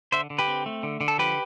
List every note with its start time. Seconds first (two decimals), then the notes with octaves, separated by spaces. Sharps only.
0.12 D3 C5 E5
0.30 D3
0.39 G4 B4
0.48 C4
0.66 A3
0.83 D3
1.01 D3
1.08 A4
1.18 F3 G4 B4